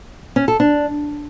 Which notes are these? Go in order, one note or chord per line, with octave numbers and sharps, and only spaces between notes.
C#4
A4
D4